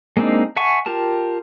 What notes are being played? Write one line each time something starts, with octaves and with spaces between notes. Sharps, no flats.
G#3 A#3 C4 D4 D#4
E5 F#5 G#5 A5 C#6
F4 G4 A#4 A5